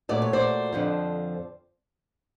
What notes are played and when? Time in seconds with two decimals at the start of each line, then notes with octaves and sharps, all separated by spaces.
0.09 A#2 F#3 A3 D5
0.22 C#5
0.33 C5 D5
0.73 F2 D3 F3